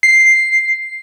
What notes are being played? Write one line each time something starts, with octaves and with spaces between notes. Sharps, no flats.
C7